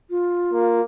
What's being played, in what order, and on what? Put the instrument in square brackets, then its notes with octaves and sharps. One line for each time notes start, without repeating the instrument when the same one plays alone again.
[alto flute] F4
[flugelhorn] A#3